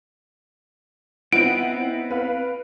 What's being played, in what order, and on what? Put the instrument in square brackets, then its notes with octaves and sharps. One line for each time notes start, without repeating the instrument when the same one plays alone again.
[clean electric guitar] B3 C4 [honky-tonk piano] D#4 E4 F#5 [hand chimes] D7
[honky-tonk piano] B4 F5